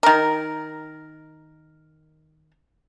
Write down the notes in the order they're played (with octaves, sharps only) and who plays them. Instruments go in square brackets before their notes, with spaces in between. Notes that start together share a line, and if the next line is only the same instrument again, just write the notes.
[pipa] D#3 A#4